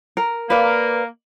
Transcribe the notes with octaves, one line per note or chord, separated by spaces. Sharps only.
A#4
A#3 B4 D5